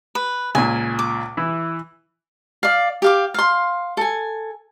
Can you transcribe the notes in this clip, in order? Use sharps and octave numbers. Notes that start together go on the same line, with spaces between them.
B4
C#2 A#2 G#5
D6
E3 E4
D5 F5
G4 F5 D6
F5 C6
A4 G#5